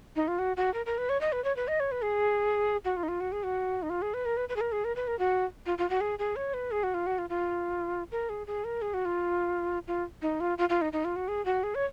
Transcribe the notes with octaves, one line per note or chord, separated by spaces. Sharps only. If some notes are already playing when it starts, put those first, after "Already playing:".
D#4
F4
F#4
F#4
A#4
A#4
B4
C#5
D#5
B4
C#5
B4
D#5
C#5
B4
G#4
F#4
F4
D#4
F4
F#4
G#4
F#4
D#4
F4
G#4
B4
A#4
B4
B4
G#4
A#4
G#4
A#4
B4
A#4
F#4
F4
F4
F#4
G#4
G#4
C#5
B4
G#4
F#4
F4
F#4
F4
F4
A#4
G#4
G#4
A#4
G#4
F#4
F4
F4
D#4
F4
F4
F4
D#4
D#4
F4
F#4
G#4
F#4
G#4
C#5